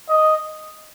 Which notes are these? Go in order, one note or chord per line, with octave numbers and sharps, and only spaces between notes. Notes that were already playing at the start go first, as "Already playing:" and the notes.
D#5